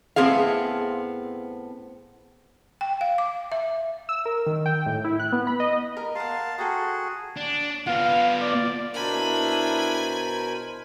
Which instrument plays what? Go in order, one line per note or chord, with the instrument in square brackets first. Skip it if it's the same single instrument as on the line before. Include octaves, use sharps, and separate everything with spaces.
[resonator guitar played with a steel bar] A2 B3 C4 G#4 F5
[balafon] G5
F5
D6
E5
[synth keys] E6
A#4
D#3
G5
A2
E4
F#6
B3
B5
D#5
[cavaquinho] A#4
[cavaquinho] A#4 F#5 [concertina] F5 A5 C6
[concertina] F#4 G#4 [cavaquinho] A4 G5 A#5
[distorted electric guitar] D4
[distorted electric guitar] B3 F4 [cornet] F5
[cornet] D5
[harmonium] B2 A#4 C5 [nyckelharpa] D4 E4 [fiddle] G#5 B5